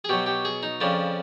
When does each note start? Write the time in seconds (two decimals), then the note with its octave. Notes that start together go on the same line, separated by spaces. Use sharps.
0.04 G#4
0.09 B2 F#3 G4
0.26 G4
0.45 G#4
0.63 D#4
0.80 F2 C#3 F3 D4